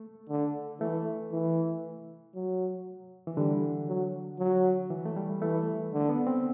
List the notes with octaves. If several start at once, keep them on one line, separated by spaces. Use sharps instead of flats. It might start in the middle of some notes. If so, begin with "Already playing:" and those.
Already playing: A3
D3
E3 A3
E3
F#3
E3
D3 G3
F#3
F#3
E3
A3
G3
E3 A3
D3
B3
C4